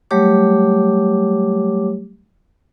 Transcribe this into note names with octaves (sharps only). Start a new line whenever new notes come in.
F#3 G3 A3 G4 C#5 D6